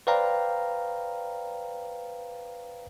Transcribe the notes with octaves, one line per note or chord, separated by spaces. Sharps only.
B4 C5 D5 F5 G5 A#5